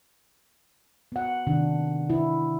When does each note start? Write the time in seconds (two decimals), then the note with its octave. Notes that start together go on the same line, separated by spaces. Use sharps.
1.12 B3 F#5
1.47 C3 D#3 D4
2.10 E4